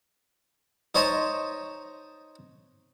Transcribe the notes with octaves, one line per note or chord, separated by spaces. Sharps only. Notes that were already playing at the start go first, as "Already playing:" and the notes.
D#4 C5 C#5 D#5 A5